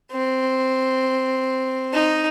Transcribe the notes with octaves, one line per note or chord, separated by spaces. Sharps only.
C4
D#4